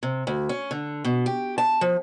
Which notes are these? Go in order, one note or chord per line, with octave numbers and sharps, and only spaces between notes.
C3
D2
C#4
D3
B2
G4
A5
F3